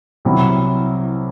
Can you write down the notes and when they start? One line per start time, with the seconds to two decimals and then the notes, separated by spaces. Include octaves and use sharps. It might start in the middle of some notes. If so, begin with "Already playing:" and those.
0.25 C2 C3 F#3 C4 E4